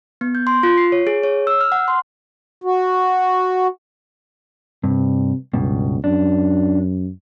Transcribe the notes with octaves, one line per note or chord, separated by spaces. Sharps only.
B3
G6
C6
F4
C7
C#5
G#4
C#5
E6
F6
F#5
C6
F#4
G2 C3
C#2 G2 B2
F#2 D4